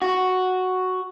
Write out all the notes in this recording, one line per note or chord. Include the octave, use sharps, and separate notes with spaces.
F#4